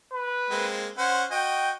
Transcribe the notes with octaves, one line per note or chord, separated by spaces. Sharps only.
B4
G#3 A#3 C4
C#4 C5 F#5
F#4 D#5 G5